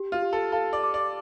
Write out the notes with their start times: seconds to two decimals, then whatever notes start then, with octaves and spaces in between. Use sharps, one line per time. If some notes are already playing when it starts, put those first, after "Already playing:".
Already playing: G4
0.12 F4
0.22 G4
0.33 A4
0.52 A4 F5
0.73 D5
0.84 D6
0.94 D5